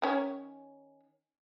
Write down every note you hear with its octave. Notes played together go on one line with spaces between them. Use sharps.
D#3 C#4 C#5